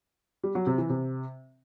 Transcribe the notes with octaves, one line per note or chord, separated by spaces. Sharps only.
G3
F#3
C3
E3
C3